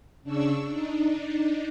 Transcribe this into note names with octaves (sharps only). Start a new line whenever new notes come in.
C#3 D4 C#6 E6
D4 D#4